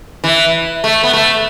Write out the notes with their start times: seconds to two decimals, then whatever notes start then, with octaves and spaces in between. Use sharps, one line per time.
0.24 E3
0.84 A3
1.04 B3
1.13 A3